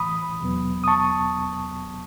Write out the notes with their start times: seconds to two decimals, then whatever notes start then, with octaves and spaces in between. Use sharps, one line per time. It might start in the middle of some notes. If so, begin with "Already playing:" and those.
Already playing: A2 E3 A3 B5 D#6
0.41 E2 B2 F#3 B3
0.84 D#6
0.88 A5 C#6